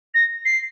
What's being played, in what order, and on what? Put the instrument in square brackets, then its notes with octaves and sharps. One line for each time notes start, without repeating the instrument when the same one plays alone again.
[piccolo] A#6
C7